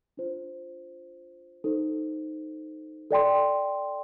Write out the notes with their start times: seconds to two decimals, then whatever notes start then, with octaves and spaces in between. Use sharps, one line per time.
0.17 D4 F4 C5
1.64 D#4 A4 C5
3.11 A4 D5 G5 C6